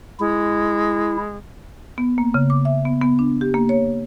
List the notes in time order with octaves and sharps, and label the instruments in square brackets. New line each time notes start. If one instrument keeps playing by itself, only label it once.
[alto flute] G#3 [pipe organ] E4
[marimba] B3
A#3
C#3
D6
E5
B3
B3
D4
G4
A#3
C#5